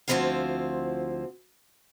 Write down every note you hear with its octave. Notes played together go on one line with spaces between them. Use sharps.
D2 E3 F3 C4 E4 F5